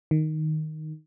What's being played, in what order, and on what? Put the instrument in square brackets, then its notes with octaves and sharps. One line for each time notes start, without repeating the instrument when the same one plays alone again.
[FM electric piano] D#3